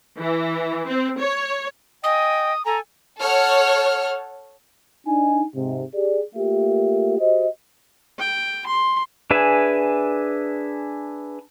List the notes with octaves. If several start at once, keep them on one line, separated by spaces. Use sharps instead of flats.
E3
C4
C#5
D#5 G5 G#5 D#6
A4 G#5 A#5
A4 C#5 F#5 F6
D4 D#4 G#5
G#2 C3
G4 G#4 D5
A3 A#3 F4 G4 A#4 E5
F#4 G4 C5 D#5
G5
C6
D4 G#4 B4 E5 G#5